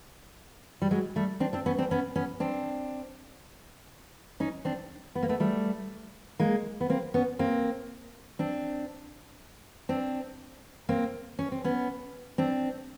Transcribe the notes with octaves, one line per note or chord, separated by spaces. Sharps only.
G3
F#3 G#3
G3 A3
C4 D4
C4 D4
B3 C#4
C4 D4
B3 C#4
B3 C#4
C4 D4
C#4 D#4
C4 D4
B3
A#3
A3 B3
G3 A3
G#3 A#3
B3
A#3 C4
B3 C#4
A#3 C4
C4 D4
C4 D4
A#3 C4
C#4
C4
B3 C#4
C4 D4